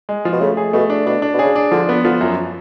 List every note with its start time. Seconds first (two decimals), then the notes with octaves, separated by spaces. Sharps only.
0.09 G#3
0.25 F3
0.33 B2
0.41 C#3 A3
0.57 G#4
0.73 B2 A3
0.90 D4
1.06 B2 D4
1.22 D4
1.34 B2
1.39 C#3 G#4
1.56 D4
1.71 D3 F3
1.89 B3
2.04 D3 F3
2.21 F#2